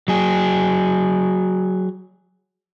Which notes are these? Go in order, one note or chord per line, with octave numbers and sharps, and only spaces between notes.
F#3 G#4